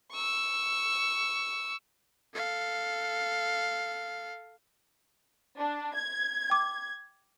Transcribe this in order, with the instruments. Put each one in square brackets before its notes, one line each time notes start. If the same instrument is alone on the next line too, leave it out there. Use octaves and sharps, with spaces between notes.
[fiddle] C#6 E6
[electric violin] A4 F5
[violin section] D4
G#6
[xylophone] G5 D6